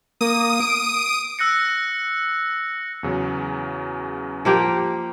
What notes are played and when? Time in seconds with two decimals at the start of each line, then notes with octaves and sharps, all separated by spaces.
0.21 A#3 D#6
0.60 D7
1.39 E6 F#6 A#6 C#7
3.03 E2 C#3 F#3
4.45 F3 A#3 G4